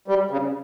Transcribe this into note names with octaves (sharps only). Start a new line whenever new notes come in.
G3
C#3